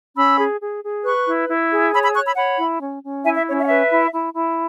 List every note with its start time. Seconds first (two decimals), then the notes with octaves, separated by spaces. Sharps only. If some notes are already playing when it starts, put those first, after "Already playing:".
0.17 C#4 B5 E6
0.39 G#4
0.61 G#4
0.83 G#4
1.05 B4 C#6 F#6
1.27 E4
1.49 E4
1.71 G#4
1.93 C#5 B5 E6
2.03 B5 E6
2.15 C#5 C#6 F#6
2.26 B5 E6
2.36 C#5 F#5 B5
2.59 E4
2.81 C#4
3.03 C#4
3.24 E4 E5 G#5
3.35 E5
3.47 C#4 C#5
3.58 E5
3.64 F#5
3.69 B4 E5
3.90 E4
4.12 E4
4.35 E4